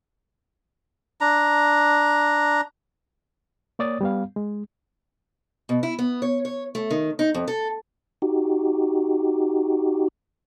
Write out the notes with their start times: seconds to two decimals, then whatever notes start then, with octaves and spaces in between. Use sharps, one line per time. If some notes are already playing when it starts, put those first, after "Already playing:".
1.21 D4 A#5
3.79 A#3 C#5 D5 D#6 A6
4.01 G3 B3 F5
4.36 G#3
5.69 B2
5.83 E4
5.99 B3
6.22 C#5
6.45 C#5
6.75 A3
6.91 D#3
7.19 D#4
7.34 F2
7.48 A4
8.22 D#4 F#4 G4